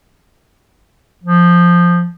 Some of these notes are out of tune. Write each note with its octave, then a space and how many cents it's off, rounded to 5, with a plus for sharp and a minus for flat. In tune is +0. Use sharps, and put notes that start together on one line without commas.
F3 +0